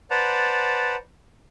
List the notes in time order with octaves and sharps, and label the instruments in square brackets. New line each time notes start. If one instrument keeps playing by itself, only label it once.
[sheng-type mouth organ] B4 C5 D5 F#5 A5 A#5